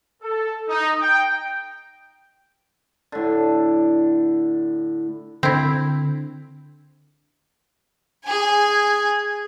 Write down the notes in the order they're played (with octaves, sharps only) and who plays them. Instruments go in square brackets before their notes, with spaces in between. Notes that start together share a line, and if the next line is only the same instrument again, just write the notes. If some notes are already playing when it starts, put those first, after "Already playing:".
[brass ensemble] A4
D#4
G5
[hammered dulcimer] A2 D3
[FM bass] D3 [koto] C4 E4
[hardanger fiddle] G#4 G#5